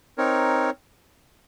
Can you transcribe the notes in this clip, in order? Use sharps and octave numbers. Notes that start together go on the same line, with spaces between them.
C4 D#4 A#4 C#5